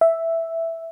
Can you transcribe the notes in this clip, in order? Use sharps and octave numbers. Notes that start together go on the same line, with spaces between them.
E5